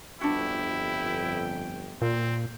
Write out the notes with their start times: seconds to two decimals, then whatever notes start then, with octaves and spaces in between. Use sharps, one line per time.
0.21 G1 F2 D4 E4 F#4 G5
2.02 A#2 C4